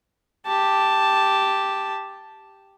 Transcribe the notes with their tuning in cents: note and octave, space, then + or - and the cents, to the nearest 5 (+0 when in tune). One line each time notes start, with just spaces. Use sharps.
G4 +0 A5 +0